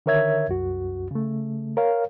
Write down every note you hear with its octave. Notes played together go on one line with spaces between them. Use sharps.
D3 D#3 A#4 C#5 E5 G#6
C2 F#2 F#4
C#3 A3
A#4 C#5 F5